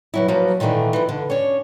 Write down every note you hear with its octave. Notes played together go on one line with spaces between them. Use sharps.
B2 F#3 E4
F3 F#3 A#3 F#4 B4
A#2 D#3 E3 A3 D4
E3 F3
D3
C#4 D4 C#5